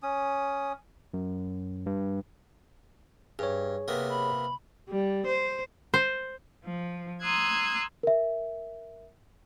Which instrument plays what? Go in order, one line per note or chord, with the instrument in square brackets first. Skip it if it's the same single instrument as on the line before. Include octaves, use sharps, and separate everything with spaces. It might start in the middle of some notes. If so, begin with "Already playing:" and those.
[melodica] C#4 D#6
[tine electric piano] F#2
G2
[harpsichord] G2 [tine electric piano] G#4 C#5
[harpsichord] C3 A#3 B3
[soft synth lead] B5
[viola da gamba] G3
C5
[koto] C5
[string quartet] F3
A#5 C6 D#6 E6 F#6 G#6
[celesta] A#4 E5